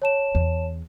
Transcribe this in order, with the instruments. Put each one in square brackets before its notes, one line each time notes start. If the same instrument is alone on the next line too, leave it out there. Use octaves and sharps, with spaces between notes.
[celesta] C#5 A5 E7
[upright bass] E2